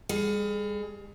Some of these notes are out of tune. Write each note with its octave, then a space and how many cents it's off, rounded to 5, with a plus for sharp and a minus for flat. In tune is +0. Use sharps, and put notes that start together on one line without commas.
G3 +45 G#4 +25